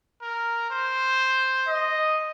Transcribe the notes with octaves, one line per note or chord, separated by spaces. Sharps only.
A#4
C5
D#5